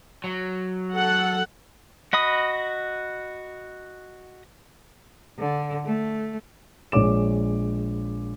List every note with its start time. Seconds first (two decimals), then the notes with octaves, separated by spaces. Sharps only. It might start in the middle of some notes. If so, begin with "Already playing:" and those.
0.24 F#3
0.95 A4 F#5
2.13 F#4 D#5 B5 D#6
5.39 D3
5.86 A3
6.92 A#1 G#3 C#5 D6 E7